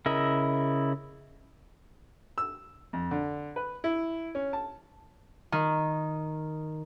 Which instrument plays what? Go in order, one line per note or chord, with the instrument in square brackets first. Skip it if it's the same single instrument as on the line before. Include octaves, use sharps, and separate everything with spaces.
[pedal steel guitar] C#3 E4 A#4 D#5 E6
[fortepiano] E6
F2
D3
B4
E4
C#4
A5
[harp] D#3